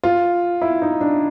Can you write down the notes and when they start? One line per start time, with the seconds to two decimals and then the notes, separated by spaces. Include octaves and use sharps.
0.03 F4
0.62 E4
0.82 D#4
1.01 D4